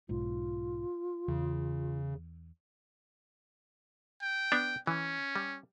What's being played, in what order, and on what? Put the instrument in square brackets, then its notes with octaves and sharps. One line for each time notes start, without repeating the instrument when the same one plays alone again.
[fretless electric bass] B1 G#2 [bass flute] F4
[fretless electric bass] E2 [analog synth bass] C#3
[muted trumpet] G5
[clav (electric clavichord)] B3 D4
[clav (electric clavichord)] E3 [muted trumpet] C#4
[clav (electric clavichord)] G3